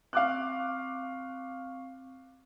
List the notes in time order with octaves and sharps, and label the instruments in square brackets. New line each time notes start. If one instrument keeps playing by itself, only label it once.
[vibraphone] C4 C#6 [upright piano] F5 D6 F#6